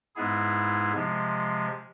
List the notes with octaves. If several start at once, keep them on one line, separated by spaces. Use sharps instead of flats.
G#2 G#3 B3 E4 G#4
C3 F3 G#3